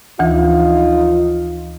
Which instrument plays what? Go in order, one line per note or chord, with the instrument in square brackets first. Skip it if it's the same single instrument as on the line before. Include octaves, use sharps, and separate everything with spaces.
[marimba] D2 E3 [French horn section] F3 D#4 F4